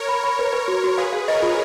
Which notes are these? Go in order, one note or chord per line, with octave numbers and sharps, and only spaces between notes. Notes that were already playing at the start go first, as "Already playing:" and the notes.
Already playing: A#4 C#5
B5
B5
B4
B4
F#4
F#4
G#4 B4 F5
F5
A#4 C#5 D#5
F4